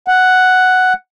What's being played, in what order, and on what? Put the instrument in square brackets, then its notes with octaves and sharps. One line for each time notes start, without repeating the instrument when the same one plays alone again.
[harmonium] F#5